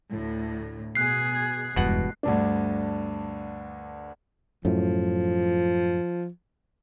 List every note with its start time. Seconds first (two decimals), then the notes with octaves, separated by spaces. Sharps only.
0.11 D2 A2
0.95 B2 G#4 F#6 C7
1.76 F1 E2 G2 B2 G#3 F#5
2.23 D2 G2 D4
4.65 F#2 A2 F3